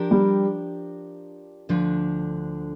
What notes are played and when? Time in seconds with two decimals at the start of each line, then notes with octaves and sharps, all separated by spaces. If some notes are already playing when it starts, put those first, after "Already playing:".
Already playing: F3 D4 G4 A#4
0.11 G3
1.69 D2 D3 F3 D4